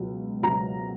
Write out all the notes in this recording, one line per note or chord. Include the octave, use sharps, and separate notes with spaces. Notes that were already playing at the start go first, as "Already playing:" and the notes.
Already playing: C#2 B2 F#3
C#2 B2 F#3 A#5